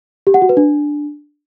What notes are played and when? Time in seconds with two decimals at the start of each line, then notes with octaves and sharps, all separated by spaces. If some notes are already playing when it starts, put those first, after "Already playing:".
0.27 G4
0.34 F#5
0.42 F#4
0.49 B4
0.57 D4